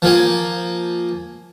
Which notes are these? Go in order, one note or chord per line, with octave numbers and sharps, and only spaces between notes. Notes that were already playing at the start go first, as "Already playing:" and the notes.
F3 A#3 G#5